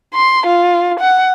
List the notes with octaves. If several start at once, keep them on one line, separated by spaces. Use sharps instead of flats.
C6
F4
F#5